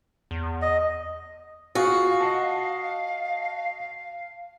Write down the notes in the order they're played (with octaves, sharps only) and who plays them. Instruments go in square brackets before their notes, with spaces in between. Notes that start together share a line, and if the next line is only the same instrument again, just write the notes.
[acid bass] E2
[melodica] D#5
[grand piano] F4 G#4 [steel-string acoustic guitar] F#4 [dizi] F5
[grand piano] D#5 F#5 A5